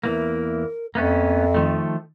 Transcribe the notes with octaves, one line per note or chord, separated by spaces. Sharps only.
E2 E3 A#3 A#4
F2 A#3 B3 C#4 E5
D#3 F3 A3